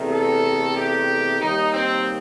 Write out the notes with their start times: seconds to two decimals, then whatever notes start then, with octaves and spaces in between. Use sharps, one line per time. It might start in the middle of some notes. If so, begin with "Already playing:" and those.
Already playing: E2 C3 D#3 A3
0.11 A4
0.75 G4
1.40 D#2 D#3 G3 D#4
1.72 C4